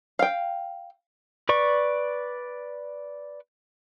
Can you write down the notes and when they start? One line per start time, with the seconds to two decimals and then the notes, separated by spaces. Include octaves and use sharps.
0.19 F5 G5
1.49 B4 D5 C#6